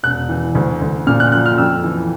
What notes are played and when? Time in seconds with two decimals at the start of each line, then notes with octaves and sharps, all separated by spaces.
0.03 E1 F#6
0.29 E3
0.55 D2
0.82 D2
1.07 A#2 F6
1.20 F#6
1.32 F3 F#6
1.46 F6
1.58 F2 E6
1.84 E3